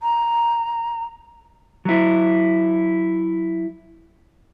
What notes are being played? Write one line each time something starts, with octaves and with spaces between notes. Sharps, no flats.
A#5
F#3 E4